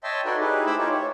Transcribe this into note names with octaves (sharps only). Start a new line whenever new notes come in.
C#5 D#5 E5 G5 A5 C6
D#4 F#4 A4 B4 C#5 D5
D#4 E4 G4 G#4 B4
A3 C5 B5 D6 E6
D#4 F4 G4 C#5
C#5